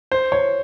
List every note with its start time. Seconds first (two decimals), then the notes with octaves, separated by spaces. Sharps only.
0.12 C5
0.32 C#5